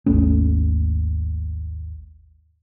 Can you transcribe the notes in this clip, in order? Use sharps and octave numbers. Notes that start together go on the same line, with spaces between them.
G#1 D#2 A3 C#4